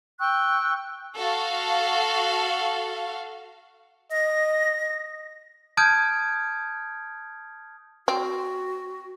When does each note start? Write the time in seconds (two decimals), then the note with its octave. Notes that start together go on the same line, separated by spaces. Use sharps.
0.19 G5 C#6 E6 F#6
1.17 F#4 A4 F5
4.12 D#5 A#6
5.77 A5 D#6 F6 G6 G#6 D7
8.08 C4 F#4